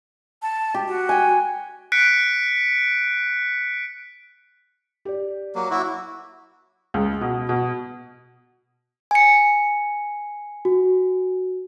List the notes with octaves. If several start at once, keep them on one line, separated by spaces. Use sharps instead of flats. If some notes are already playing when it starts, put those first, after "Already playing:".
A5
G4
F#4
G5 G#5
F#6 B6 C#7 D7
G4 D5
F#3 A#3
E4 F#4 E5 D6
C#2
B2
B2
G#5 C#7
F#4